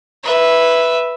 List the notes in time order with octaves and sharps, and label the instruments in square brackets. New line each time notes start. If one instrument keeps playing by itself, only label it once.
[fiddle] B4 E5